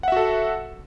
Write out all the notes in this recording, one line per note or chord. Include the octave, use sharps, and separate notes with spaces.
F#4 A4 E5 F#5